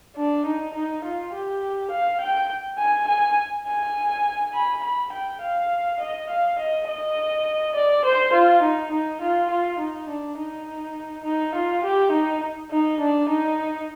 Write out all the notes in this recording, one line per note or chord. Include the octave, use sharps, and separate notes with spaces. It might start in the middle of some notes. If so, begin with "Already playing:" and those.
D4
D#4
D#4
F4
G4
F5
G5
G#5
G#5
G#5
B5
B5
G5
F5
D#5
F5
D#5
D#5
D5
C5
F4
D#4
D#4
F4
F4
D#4
D4
D#4
D#4
F4
G4
D#4
D#4
D4
D#4